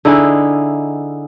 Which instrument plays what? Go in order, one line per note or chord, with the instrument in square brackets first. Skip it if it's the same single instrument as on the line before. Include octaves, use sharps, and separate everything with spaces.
[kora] D3 D#4 E4 G#4